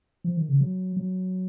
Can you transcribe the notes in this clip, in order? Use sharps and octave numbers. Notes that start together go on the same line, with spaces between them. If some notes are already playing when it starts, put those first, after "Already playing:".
F3
D#3
C#3
F#3
F#3